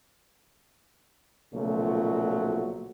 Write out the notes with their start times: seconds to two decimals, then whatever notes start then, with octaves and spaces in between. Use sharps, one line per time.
1.53 B1 A#2 C#3 F3 F#3 A3